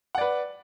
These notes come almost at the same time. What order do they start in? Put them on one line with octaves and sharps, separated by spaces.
F#5 D5 B4